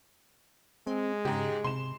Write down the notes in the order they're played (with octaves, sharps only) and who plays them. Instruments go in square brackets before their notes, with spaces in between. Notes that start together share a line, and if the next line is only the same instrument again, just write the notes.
[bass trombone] G#3 [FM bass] C4
[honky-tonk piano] G#2 G4 [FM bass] C#3
[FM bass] C3 [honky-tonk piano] C6 E7